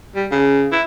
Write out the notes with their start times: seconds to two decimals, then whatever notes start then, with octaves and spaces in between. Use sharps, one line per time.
0.15 G3
0.31 C#3
0.72 E4